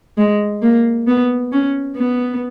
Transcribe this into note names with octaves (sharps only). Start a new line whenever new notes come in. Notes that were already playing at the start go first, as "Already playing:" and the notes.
G#3
A#3
B3
C#4
B3